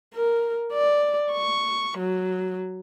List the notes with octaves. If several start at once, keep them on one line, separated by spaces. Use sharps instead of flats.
A#4
D5
C#6
F#3